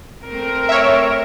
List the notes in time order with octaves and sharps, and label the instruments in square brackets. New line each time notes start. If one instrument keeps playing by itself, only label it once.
[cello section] A3 C4 A#4
[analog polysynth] C#5 E5